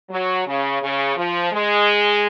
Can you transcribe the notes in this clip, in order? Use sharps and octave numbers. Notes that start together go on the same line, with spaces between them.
F#3
C#3
C#3
F3
G#3